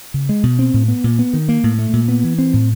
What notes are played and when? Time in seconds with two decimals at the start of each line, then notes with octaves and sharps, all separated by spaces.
0.14 C#3
0.29 G#3
0.43 B2
0.59 C4
0.74 A2
0.88 B3
1.04 A#2
1.19 B3
1.33 D#3
1.49 A#3
1.64 A2
1.79 A3
1.93 A#2
2.08 B3
2.24 E3
2.39 C4
2.54 A2